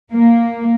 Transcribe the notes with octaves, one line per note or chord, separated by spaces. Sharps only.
A#3